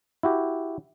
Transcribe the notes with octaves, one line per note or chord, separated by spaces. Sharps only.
E4 F#4 G4